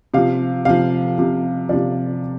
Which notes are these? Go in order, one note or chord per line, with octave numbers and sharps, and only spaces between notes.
C3 F3 F5
C3 F3 F5
C3 F3
C3 F3 D5